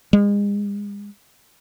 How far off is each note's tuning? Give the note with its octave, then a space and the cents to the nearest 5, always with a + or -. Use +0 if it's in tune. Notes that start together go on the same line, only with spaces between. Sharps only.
G#3 -35